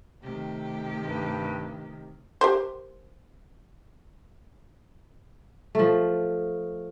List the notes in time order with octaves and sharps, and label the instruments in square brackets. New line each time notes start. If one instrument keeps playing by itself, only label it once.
[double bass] C3 D#3 [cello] A3 G4
[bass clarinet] G2
[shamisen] G4 A#4 C5
[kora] F3 A3